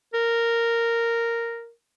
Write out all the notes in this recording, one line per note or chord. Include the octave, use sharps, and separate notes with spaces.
A#4